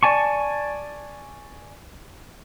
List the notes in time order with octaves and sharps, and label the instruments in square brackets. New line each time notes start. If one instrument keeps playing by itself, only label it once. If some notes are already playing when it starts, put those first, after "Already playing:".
[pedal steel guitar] D5 G#5 A5 C#6